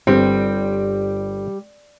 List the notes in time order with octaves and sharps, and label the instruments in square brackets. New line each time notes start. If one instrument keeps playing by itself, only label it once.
[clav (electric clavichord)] G1 G4 [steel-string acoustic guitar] G3 [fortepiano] C4